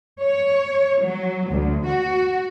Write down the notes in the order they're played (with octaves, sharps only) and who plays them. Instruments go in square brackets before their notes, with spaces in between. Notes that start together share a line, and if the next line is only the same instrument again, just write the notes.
[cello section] C#5
F#3
D2
F#4